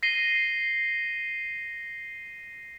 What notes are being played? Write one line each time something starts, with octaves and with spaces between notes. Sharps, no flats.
A#6 C7 D#7 G7